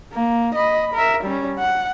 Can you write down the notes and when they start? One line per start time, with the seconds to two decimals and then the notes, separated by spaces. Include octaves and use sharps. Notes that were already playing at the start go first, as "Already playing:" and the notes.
0.13 A#3
0.55 D#5 B5
0.94 A#4 E5
1.24 G3 C#4
1.59 F#5